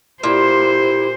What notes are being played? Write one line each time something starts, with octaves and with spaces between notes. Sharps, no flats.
A#2 E4 G4 C5